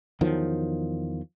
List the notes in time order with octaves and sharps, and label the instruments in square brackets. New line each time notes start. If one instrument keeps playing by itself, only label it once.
[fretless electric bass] E2 D#3 F3 F#3